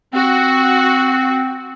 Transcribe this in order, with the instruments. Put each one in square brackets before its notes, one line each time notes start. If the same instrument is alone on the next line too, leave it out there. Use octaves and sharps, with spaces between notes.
[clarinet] C4 [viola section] F#4